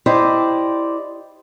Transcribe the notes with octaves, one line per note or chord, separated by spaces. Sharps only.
E4 G4 C5 D5 D#5